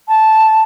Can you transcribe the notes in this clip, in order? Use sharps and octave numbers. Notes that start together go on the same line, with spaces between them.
A5